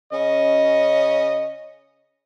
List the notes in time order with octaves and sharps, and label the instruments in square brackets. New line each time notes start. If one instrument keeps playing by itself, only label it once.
[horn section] C#3 C#4 D#5